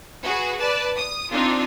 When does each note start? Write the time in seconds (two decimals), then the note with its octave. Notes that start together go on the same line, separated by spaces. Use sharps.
0.23 F#4 G#4 B4
0.58 B4 D5 A5
0.97 D#6
1.31 C4 D4 D#4 F4